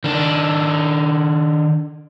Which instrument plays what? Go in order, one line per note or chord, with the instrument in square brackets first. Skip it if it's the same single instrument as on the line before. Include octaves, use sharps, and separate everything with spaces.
[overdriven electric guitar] D#3 D4